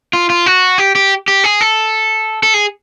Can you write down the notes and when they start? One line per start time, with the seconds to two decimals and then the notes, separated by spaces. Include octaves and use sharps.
0.13 F4
0.30 F4
0.46 F#4
0.78 G4
0.95 G4
1.28 G4
1.44 G#4
1.61 A4
2.43 A4
2.54 G#4